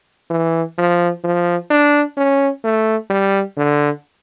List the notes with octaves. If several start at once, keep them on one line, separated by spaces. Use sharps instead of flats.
E3
F3
F3
D4
C#4
A3
G3
D3